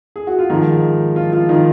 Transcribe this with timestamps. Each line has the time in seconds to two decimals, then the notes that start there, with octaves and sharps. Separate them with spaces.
0.16 G#4
0.27 F#4
0.39 F4
0.50 G#2 D#3 F3 D#4
1.16 F3 F4
1.32 F3 F4
1.49 D#3 D#4